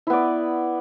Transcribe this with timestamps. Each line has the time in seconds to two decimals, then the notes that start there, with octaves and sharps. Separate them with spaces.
0.07 E4
0.10 B3
0.13 D5